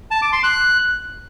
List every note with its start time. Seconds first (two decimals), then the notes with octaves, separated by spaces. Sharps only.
0.11 A5
0.22 D6
0.33 C6
0.43 F#6